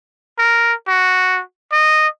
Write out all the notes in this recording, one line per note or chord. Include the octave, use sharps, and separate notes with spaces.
A#4
F#4
D#5